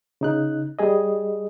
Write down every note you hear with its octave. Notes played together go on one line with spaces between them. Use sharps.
C#3 D#4 F#6
G3 G#4 D#5